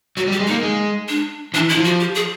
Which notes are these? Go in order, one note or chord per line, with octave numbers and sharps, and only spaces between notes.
F#3 F#4
G3
G4
G#3
A#3 D#4
G#3
D4
E3 D4
E4
F3
F#4
G4
G#4